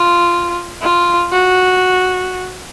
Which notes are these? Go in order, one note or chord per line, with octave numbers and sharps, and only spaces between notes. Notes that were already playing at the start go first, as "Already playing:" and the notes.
Already playing: F4
F4
F#4